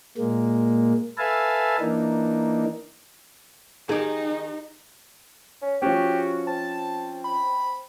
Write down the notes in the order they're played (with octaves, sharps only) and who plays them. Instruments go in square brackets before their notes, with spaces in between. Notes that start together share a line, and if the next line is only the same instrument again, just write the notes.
[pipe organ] A#2 G#3 A#3
A4 B4 E5 F5 G#5 A5
E3 A#3 D4 D#4
[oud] D#3 G4 [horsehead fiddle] D#4 [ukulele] G#4
[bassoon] C#4
[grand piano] F3 C#4 [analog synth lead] F#4 [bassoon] G4
[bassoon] C4 [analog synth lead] A5
[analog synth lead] B5